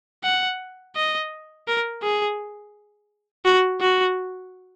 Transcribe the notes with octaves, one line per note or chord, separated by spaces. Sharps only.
F#5
D#5
A#4
G#4
F#4
F#4